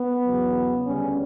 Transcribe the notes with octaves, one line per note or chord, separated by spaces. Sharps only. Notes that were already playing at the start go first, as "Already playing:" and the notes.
Already playing: B3
E2 C#3 F#3
D2 C#3 G3 C#4